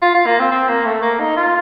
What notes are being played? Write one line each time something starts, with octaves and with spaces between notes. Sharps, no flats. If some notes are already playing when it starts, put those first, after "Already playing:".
F4
F4
A#3
C4
C4
A#3
A3
A#3
D#4
F4